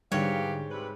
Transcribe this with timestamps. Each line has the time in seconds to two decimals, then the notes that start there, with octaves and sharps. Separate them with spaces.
0.12 G#2 D3 E3 G3 G4 C#5 F5
0.71 C3 G3 B4